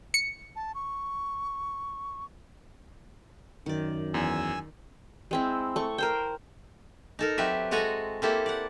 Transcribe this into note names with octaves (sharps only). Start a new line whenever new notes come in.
C#7
A5
C#6
F#2 D#3 D5
E2 G#5 E6
G#3 C4 E4
A3 C#6
A#4 C5 G5
D#4 A4 A#4
F#3 C4 G4 B4 E5
G#3 F#4 A4 F#5 G#5 A#5
A#3 C4 E4 G4 A4
D5 F#5